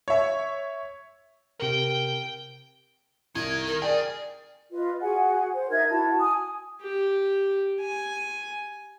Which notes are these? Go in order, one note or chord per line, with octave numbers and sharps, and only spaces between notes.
C#5 E5
C3 A#4 G5
C2 D#3 G#6
A#4
C2 G#4 D5 G5 F#7
F4 B4 D#5
F#4 G#4 F#5 G#5
C5
D#4 A#4 E5 G#6
E4 F#4 A5
G#5 D#6
G4
G#5